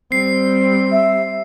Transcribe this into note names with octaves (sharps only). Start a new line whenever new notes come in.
G3 C4 C7
E5